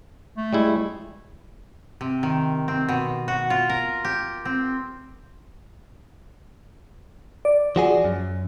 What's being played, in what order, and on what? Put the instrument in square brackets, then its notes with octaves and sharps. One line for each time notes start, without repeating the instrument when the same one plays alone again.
[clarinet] A3
[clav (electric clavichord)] G3 G#3 E4
[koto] C3
D#3
C4
B2
F#4
F4
A#4
G4
C4
[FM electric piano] D5
[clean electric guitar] F3 F#4 G#4
F#2